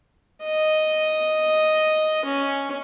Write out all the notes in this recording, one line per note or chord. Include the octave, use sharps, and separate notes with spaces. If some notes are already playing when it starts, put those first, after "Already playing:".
D#5
C#4